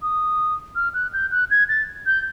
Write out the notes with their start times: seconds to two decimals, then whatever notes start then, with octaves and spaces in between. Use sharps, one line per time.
0.02 D#6
0.75 F6
0.94 F#6
1.13 G6
1.31 F#6
1.51 G#6
1.69 A6
2.06 G6